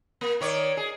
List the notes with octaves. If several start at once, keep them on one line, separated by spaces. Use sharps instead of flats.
A#3
D#3 C#5 D5
G#4